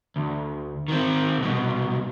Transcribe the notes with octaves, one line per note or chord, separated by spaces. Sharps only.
D2
D#3 C4
C2 B2